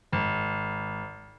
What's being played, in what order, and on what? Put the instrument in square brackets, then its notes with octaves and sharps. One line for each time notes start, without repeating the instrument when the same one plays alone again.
[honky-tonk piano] G#1